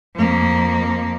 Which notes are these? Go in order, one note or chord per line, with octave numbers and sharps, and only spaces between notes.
F2 A#3